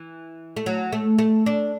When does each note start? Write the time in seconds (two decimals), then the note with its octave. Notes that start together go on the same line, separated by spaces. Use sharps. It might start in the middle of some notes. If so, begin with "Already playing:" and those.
Already playing: E3
0.56 A3
0.66 F#3
0.93 A3
1.18 A3
1.46 D4